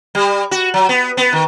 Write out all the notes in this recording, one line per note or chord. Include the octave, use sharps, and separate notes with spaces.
G3
F#4
F#3
B3
B3
D#3